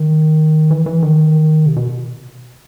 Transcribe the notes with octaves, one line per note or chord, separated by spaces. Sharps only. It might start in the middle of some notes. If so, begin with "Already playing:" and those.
Already playing: D#3
E3
E3
D#3
C3
B2